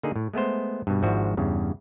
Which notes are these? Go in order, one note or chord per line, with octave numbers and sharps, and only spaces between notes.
D3 A#3 D#4 G#4
A2
G#3 A3 B3 C5
G2 B2
G#1 G#2 F3 D4 F#4 E5
E2 G2 C#3